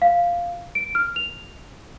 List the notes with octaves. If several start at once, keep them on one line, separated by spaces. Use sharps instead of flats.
F5
D7
F6
F7